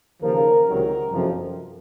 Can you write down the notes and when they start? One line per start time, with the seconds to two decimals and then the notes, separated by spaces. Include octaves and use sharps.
0.22 D#2 C#3 F3 A#4
0.67 C#2 C3 D#3 F#3 A#4
1.10 F#1 F2 C3 F3